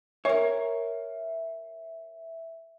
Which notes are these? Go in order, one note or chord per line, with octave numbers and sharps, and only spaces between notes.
A#4 C#5 E5